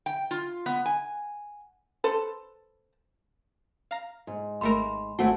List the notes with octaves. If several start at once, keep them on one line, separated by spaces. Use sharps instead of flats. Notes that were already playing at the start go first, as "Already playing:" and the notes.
G5
F4
B3
G#5
A4 B4 C5
F5 A#5
G#2
G#1 A3 A#4 B5 C6
G#1 E3 A3 C4 F#4 A5 C6